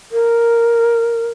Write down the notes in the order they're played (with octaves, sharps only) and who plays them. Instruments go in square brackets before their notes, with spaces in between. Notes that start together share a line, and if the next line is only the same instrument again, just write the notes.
[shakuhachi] A#4